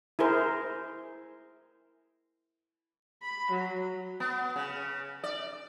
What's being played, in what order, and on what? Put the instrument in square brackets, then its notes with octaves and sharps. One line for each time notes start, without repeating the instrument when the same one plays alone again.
[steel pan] E4 G#4 A#4 C5
[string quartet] B5
F#3
[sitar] B3
C#3
D5